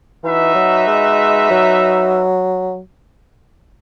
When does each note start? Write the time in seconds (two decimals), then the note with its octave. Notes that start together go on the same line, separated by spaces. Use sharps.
0.24 E3 D#4 F#4 B4 E5
0.55 F#3
0.87 G#3
1.51 F#3